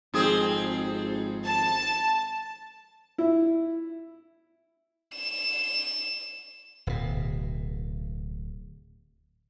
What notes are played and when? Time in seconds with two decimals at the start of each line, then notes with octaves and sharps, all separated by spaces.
0.14 G#1 F2 C4 G#4
1.45 A5
3.18 E4
5.15 E7
6.87 D1 B2